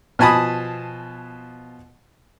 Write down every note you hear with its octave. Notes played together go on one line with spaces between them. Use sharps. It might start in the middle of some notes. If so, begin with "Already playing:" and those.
B2 F3 G#5 A5 B5 D#6